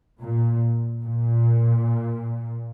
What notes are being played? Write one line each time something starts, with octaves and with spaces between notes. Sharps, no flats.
A#2
A#2